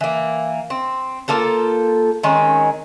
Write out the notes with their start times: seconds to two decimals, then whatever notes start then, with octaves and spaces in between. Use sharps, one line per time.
0.01 E3 A#3
0.70 C4
1.28 A#3 F4 A4 C5
2.23 D#3 G#3 C4 C#4